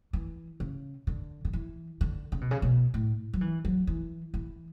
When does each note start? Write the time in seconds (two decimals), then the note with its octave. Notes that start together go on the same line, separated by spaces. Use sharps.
0.13 E3
0.60 C#3
1.07 D3
1.45 D3
1.53 E3
2.01 D3
2.32 C#3
2.41 B2
2.51 C#3
2.62 B2
2.94 A2
3.33 F#3
3.41 E3
3.65 F#3
3.87 E3
4.34 E3